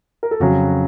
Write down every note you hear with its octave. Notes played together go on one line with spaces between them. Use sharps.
A#4
A4
F2 C#3 F#3 F#4